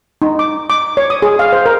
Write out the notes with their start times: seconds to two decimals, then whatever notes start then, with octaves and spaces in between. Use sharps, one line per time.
0.22 D#4
0.39 D6
0.70 D6
0.97 C#5
1.10 D#6
1.22 G#4
1.39 F5
1.53 C5
1.66 A#4